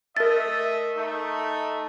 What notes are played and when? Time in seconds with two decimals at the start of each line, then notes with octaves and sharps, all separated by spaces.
0.17 A3 A#4 D#5 E5 A6
0.96 A3 D#4